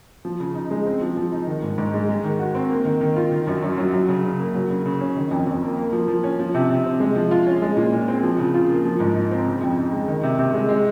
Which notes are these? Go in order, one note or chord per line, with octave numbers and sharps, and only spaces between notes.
F3
C#3
D#4
G#3
C4
F3
F3
D#4
D#3
G#2
G#2
G#3
G#3
D#3
F#4
C4
A#3
D#3
D#3
F4
D#3
F#2
F#2
F#3
F#3
C#3
C#3
A#3
F#3
C#3
C#3
C#4
D#3
F2
F2
A#3
A#3
F3
F3
C#4
F3
C3
C3
C4
G#3
F3
F4
C#4
G#3
A#2
A#2
C4
F3
C#3
F4
A#3
F3
G#2
D#4
C4
C#3
F2
D#4
G#3
D#3
C3
C3
G#3
G#3